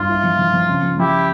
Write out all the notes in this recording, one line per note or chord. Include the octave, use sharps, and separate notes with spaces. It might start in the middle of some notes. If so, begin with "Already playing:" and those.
Already playing: G2 F4
E4
F3
F3
F3
C#3
F3
F3 E4 G4